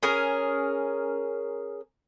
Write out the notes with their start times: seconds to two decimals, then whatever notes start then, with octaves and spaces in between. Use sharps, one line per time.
0.03 C#4 G#4 A#4